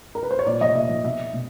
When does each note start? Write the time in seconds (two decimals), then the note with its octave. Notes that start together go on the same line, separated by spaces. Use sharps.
0.15 A#4
0.23 B4
0.31 C5
0.39 C#5
0.46 A#2 D5
0.61 F3 D#5
0.75 A#2 E5
0.90 F3
1.04 B2 E5
1.34 B2